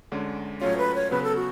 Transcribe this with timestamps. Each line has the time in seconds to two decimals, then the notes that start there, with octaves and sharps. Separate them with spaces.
0.12 D2 D3 G#3 C#4
0.61 A2 F#3 A3 C#4 F4 C#5
0.78 B4
0.95 C#5
1.11 C#3 F#3 B3 B4
1.23 A4
1.36 F#4